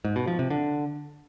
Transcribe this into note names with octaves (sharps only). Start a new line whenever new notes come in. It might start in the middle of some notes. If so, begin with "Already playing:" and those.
G#2
B2
F3
C3
D3